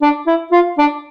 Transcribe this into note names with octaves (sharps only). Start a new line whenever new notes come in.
D4
E4
F4
D4